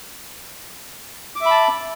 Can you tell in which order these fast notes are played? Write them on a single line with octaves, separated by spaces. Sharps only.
D6 E5 B5 A5